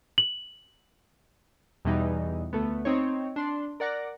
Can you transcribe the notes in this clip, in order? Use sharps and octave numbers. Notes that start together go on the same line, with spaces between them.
F#7
E2 B2 E3 G3 D#4
D2 A3 B3
C4 D#4 C#5
D4 C6
A#4 D5 F#5 D6 A#6